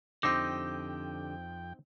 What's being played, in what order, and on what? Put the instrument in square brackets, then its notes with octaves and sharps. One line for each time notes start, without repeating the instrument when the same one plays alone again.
[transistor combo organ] F2 G5 [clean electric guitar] D3 G4 [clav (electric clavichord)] C4 D#4 [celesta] D6